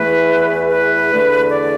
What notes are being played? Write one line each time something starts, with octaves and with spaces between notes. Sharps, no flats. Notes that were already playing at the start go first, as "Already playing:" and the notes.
Already playing: E2 E3 A3 B4
B4
E2 D3 A3
D5